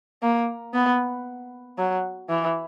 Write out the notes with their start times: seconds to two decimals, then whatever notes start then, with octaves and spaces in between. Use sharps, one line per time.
0.22 A#3
0.74 B3
1.78 F#3
2.30 E3